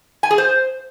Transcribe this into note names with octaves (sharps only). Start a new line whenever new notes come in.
G#5
G#4
C5